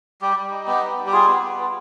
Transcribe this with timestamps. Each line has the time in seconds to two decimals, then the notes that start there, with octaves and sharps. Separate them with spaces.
0.22 G3 G4
0.36 G3
0.51 D#4
0.67 B3 G4
0.83 G3
0.97 G3
1.06 G4
1.12 F4 G#4
1.28 B3
1.43 B3
1.59 F4